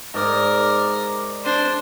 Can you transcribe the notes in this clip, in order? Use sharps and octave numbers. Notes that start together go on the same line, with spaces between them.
G#2 A#4 D5
D4 C5